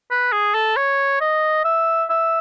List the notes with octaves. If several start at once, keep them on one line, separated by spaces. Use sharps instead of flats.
B4
G#4
A4
C#5
D#5
E5
E5